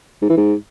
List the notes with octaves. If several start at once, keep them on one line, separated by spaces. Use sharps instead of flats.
G#2
E3
G#2